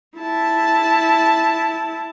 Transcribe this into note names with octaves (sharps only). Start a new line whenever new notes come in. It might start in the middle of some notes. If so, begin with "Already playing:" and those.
E4 A5